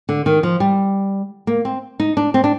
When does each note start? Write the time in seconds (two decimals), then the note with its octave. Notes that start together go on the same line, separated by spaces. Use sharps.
0.09 D3
0.26 D#3
0.43 F3
0.60 G3
1.47 A#3
1.65 C4
2.00 D#4
2.17 D4
2.34 C4
2.44 D4